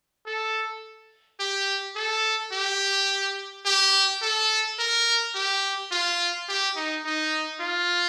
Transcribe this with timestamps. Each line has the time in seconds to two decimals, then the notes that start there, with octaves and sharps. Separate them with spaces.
0.26 A4
1.40 G4
1.96 A4
2.52 G4
3.65 G4
4.22 A4
4.79 A#4
5.35 G4
5.92 F4
6.49 G4
6.76 D#4
7.05 D#4
7.61 F4